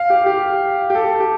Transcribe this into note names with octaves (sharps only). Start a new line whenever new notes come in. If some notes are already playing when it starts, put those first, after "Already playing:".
Already playing: F5
G4
G4
G4
A4
G4